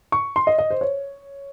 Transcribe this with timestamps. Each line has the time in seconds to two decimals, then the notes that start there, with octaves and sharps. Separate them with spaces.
0.12 C#6
0.36 C6
0.47 D#5
0.58 D#5
0.70 C5
0.81 C#5